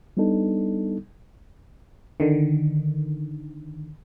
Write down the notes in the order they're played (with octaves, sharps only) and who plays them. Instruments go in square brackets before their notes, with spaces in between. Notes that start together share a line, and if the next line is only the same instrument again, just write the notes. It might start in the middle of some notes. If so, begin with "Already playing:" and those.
[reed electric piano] G3 B3 D4 D#4 A4
[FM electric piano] D3 D#3